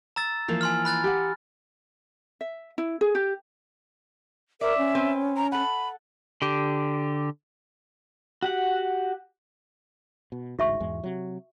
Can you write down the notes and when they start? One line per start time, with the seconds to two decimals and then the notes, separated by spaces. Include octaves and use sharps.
0.16 A#5 E6 A6
0.48 E3 F3 A#3
0.61 G#5 C6 F6
0.85 B5 F#6 A6
1.04 G4 F#5
2.41 E5
2.78 E4
3.01 G#4
3.15 G4
4.61 A#4 C5 D5 E5
4.78 C#4
4.95 C4 B4 C5
5.37 A#5
5.52 A4 F#5 B5
6.42 D3 G4
8.43 F#4 G4 F#5
10.32 B2
10.59 A1 D2 G#2 F#4 E5 C#6
10.80 E2 G#2 G#3
11.04 C3 F#3